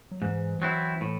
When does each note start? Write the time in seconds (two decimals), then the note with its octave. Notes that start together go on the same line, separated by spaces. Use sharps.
0.11 F#3
0.21 G#2 E3
0.62 F#3 C4 E4
1.01 A2